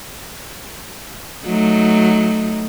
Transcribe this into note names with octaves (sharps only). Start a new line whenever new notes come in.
F#3 A3 D#4